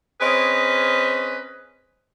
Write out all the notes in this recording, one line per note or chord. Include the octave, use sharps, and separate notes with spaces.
C4 C#4 G#4 B4 C#5 D#5